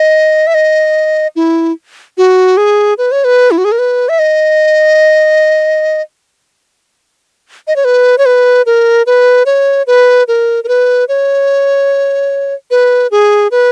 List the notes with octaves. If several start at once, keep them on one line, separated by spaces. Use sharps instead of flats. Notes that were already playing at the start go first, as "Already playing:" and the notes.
Already playing: D#5
E5
D#5
E4
F#4
G#4
B4
C#5
B4
E4
F#4
G#4
A#4
B4
E5
D#5
D#5
C#5
B4
C#5
B4
A#4
B4
C#5
B4
A#4
A#4
B4
C#5
B4
G#4
B4